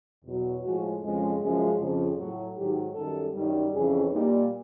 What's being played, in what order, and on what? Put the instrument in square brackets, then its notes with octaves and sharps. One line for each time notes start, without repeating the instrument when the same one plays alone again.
[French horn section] E2 B2 F#3
A2 F3 G#3 F#4
F2 C#3 F3 G#3
F#2 C#3 F3 G#3
F2 C#3 F3
A2 F#3 F#4
G#2 D#3 F#3 G4
F#2 D#3 G3 A4
F#2 D#3 G3
F2 C#3 E3 G#4
A#2 G3 D#4